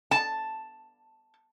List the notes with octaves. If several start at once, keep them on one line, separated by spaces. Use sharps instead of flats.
A5